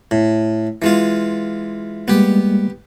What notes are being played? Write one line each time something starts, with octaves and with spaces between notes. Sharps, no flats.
A2
E3 G#3 F4
G3 G#3 A#3 B3 G4